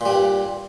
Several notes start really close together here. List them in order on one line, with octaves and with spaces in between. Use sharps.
A#2 G3 G2